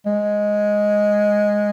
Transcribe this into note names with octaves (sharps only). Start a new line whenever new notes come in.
G#3